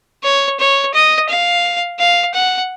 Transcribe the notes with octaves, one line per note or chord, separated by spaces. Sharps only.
C#5
C#5
D#5
F5
F5
F#5